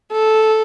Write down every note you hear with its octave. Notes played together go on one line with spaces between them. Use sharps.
A4